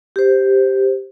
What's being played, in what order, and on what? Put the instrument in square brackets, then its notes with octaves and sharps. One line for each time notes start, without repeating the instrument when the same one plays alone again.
[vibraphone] G4 C5